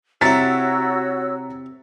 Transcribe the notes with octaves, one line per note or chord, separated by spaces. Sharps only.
C3 E4 F#4 C#5 A#5 E6 A6 B6